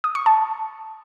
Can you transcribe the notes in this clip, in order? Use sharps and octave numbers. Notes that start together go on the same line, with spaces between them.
D#6
C#6
A5